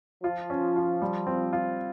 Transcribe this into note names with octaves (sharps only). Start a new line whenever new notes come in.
F3 F4
C#4
F4
G3
C4
F4